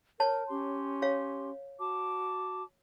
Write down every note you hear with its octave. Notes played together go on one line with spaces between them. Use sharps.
A#4 C#5 A5
C#4 G4 C6
C#5 F5
F#4 A5 D6